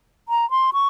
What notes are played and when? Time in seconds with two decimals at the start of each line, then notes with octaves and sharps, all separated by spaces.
0.29 A#5
0.50 C6
0.73 C#6